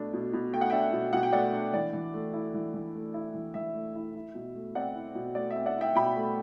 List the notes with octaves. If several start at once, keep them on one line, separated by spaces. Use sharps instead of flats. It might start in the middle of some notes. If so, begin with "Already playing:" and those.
Already playing: B2 A3 D4
B2
B2
A3 G5
F#5
D4 E5 G5
B2
B2 F#5
G5
A3 D5 F#5
D4
E3 D5
E3
A3
E4
E3
E3
A3
E4
E3
E3 E5
A3
E4
E4
B2
A3
C4 D5 F#5
E4
B2
A3 D5
E5
C4
D5 F#5
E4 E5 G5
B2 G5 B5
A3